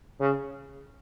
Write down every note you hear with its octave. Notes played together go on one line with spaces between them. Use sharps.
C#3